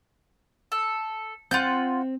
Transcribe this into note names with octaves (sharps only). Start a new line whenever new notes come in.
A4
C4 F4 F#5 G6